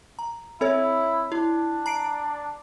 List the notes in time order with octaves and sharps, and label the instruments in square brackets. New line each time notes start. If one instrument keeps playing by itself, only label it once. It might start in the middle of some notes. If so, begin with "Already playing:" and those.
[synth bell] A#5
[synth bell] C4 A4 C#5 [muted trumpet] E4
[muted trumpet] D4 [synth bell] E4
[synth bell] A#5 C7 D7